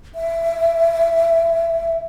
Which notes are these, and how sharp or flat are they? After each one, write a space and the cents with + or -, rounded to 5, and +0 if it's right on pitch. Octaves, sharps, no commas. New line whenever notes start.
E5 +15